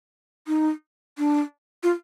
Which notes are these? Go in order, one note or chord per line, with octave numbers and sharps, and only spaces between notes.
D#4
D4
F4